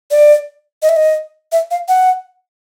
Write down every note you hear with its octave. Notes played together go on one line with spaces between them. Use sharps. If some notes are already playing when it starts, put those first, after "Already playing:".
D5
D#5
E5
D#5
E5
F5
F#5